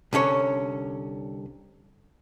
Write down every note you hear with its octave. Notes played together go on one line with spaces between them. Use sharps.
C2 D3 C#4 C#5